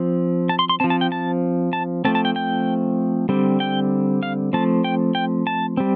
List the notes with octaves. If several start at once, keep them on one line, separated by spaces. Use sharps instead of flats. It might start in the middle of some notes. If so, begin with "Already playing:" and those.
Already playing: F3 C4
A5
C6
C6
F3 C4 A5
A5
G5
A5
A5
F3 A3 C4 A5
A5
G5
G5
D3 G3 C4
G5
F5
F3 A3 C4 A5
G5
G5
A5
G3 C4